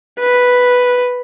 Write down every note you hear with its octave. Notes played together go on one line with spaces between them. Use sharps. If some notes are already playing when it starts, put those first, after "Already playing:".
B4